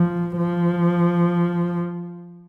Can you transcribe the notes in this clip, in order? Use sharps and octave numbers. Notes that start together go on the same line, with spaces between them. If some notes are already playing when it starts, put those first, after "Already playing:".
Already playing: F3
F3